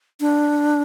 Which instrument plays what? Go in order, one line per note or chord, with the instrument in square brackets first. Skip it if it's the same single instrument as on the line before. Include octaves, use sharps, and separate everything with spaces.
[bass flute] D4